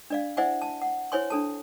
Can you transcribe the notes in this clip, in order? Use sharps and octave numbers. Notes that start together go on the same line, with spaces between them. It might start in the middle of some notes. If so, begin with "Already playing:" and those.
D4 D5 F5
E4 C5 D5 E5 F#5 G#5
A5
F#5
E4 C5 C#5 G#5 C6
D4 A4 A5